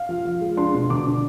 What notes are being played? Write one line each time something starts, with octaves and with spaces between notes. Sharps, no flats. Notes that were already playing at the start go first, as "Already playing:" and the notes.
Already playing: F5
F3
F3
G#3
D4 C6
B2
D3 D6
D4